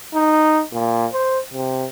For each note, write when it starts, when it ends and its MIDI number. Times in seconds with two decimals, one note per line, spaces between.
0.14 0.61 63
0.73 1.06 46
1.13 1.38 72
1.53 1.87 48